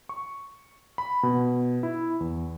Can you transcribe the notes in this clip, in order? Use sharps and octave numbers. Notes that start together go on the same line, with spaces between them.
C#6
B5
B2
E4
E2